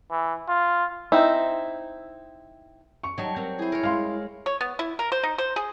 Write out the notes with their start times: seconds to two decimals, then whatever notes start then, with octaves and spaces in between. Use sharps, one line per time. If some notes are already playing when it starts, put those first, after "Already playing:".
0.11 E3
0.49 F4
1.12 C4 D#4 E4
3.03 C#6
3.18 F#3 G3 D#4 A4
3.36 C4 A#4
3.59 E4 G#4 C5
3.72 A#4 C#5
3.83 G#3 F5 C6
4.46 C#5
4.61 B3
4.79 E4
4.99 A#4
5.12 C5
5.23 D#4
5.38 C5
5.56 G#4